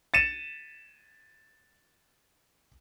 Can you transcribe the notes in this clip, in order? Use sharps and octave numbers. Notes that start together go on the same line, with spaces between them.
A6 C#7 D#7 E7